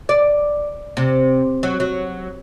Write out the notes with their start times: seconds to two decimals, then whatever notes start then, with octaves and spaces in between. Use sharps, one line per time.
0.09 D5
0.97 C3
1.63 F#3
1.80 F#3